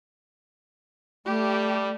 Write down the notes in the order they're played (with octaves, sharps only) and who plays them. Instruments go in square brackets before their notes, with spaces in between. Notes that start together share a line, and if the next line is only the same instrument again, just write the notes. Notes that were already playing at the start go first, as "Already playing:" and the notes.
[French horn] G3 [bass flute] A3 [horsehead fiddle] G4